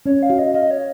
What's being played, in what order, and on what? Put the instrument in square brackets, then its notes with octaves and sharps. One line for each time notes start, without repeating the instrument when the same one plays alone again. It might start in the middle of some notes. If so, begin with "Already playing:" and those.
[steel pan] C#4 [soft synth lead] C#5
[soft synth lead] F5
[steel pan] F#4
[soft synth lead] D#5
[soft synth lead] D#5 [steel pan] F5
[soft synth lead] C#5